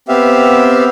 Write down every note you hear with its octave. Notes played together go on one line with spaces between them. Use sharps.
B3 C4 G4 E5 F5